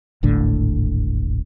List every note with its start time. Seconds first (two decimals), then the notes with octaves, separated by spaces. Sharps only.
0.23 D#1 G#1 A2 D3